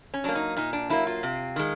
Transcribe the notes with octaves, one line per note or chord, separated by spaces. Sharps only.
C#4
F#3 A#3 D4
D#4
A#2 D#4
D4
F#3 A#3 E4
F4
C3
D#3 G#3